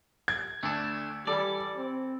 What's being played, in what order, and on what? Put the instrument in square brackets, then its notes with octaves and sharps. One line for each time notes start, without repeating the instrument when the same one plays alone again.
[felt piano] G#6
[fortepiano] D2 [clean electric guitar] A3 D4
[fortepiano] E3 A4 [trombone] G3 [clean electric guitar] D5
[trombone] C4